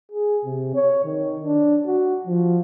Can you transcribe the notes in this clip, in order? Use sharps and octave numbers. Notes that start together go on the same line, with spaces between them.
G#4
C3
C#5
D#3
D4
F#4
F3